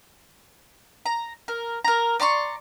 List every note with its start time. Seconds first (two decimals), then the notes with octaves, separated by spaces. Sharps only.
1.06 A#5
1.48 A#4
1.85 A#4 A#5
2.20 D5 A#5 C6 C#6